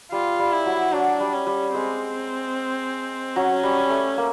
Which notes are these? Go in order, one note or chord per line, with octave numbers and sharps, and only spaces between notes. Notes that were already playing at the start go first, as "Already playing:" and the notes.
G3 F4
G3
E4
F#3
F#3 D4
G3
C#4
G3
G#3 C4
F#3 C#4
G3
A3
A#3